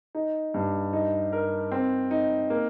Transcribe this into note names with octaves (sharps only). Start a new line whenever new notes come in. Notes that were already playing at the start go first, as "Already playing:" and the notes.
D#4
G2
D#4
A#4
C4
D#4
A#3